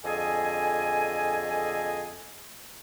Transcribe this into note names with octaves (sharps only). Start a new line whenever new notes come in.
F2 D3 G#4 A4 D#5 G#5